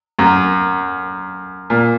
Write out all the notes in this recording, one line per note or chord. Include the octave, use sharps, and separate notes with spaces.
F#2
A#2